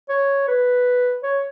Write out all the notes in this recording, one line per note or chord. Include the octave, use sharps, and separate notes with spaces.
C#5
B4
C#5